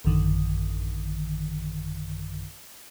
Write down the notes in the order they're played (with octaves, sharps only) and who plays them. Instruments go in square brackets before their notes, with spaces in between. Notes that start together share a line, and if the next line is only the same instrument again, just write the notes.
[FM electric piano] A1 F#2 D3 D#3